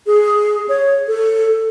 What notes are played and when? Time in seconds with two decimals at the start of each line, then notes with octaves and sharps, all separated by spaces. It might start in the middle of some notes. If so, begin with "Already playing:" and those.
0.07 G#4
0.69 C#5
1.08 A4